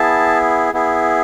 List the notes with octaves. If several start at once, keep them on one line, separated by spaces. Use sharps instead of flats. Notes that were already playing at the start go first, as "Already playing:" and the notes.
Already playing: B3 E4 G#4 A5
B3 E4 G#4